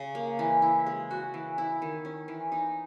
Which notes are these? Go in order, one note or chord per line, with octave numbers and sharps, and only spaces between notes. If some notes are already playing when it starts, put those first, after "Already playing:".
Already playing: C#3
A#3
E3
E4
G#3
F#4
E3
E4
D#3
C#4
E3
D#4